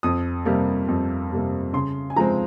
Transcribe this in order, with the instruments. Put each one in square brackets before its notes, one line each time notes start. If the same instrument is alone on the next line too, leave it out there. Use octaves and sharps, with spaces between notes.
[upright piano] F2 D#6
C3 G3 A#3
F2
C3 G3 A#3
C#3 C6
G#5
F3 G#3 C4 A#5